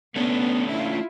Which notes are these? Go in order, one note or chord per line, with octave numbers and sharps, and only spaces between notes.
A3 B3 C#4 D4
E4 F4